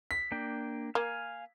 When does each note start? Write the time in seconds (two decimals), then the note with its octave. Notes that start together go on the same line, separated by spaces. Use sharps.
0.11 B6
0.32 A#3 D4 G5
0.95 A#3 F5 G#5